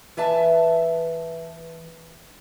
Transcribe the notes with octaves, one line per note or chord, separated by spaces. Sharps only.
E3 B4 E5 A5